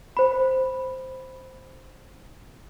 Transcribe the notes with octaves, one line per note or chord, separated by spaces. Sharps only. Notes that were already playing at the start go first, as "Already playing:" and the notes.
C5 B5